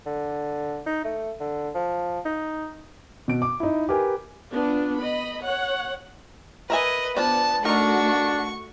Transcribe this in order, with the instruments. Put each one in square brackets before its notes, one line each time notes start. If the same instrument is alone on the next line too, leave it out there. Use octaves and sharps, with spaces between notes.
[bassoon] D3
D#4
A3
D3
F3
D#4
[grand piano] B2 D7
D6
D#4 E4
G4 A#4 B4 G#5
[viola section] B3 D4 F4
D#5 B5
C#5 F#5
[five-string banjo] A#4 E5 G#5 [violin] B4 D#5
[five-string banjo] F3 D4 D5 [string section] B3 [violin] A5
[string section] A3 F#4 [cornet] D4 [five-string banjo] D#4 A#4 [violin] C#6